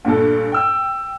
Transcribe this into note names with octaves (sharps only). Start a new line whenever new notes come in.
G2 A#2 A3 A4
G5 E6